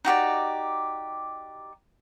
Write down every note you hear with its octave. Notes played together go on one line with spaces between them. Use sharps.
D#4 F#4 G4 D5